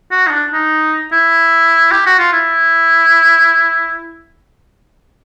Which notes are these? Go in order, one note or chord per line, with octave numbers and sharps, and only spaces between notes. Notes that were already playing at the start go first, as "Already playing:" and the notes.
F#4
D#4
D4
D#4
E4
G4
F#4
F4
E4